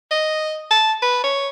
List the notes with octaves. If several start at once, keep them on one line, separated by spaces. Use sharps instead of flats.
D#5
A5
B4
C#5